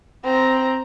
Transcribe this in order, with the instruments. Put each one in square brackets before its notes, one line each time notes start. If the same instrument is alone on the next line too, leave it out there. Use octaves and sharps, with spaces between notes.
[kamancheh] C4 A#5